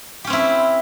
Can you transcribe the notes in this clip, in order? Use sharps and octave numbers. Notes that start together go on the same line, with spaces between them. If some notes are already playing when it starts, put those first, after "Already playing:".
C4 C#4 E4 G4